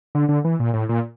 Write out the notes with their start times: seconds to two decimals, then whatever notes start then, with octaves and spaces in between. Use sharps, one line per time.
0.15 D3
0.29 D3
0.45 E3
0.60 A#2
0.73 A2
0.89 A#2